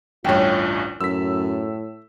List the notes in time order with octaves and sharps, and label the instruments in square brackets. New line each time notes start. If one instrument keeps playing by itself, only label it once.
[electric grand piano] A1 D2 G2 [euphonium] F4 [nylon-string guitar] C#5 G5
[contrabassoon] F#2 [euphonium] A2 [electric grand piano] E6 B6